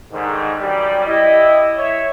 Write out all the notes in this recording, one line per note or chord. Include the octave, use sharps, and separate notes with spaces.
G#2 D3 D#3
F#2 G3 G4 D5
E4 G4 D#5
C#5 E5